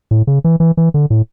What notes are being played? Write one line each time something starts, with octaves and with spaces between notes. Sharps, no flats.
A2
C#3
E3
E3
E3
D3
A2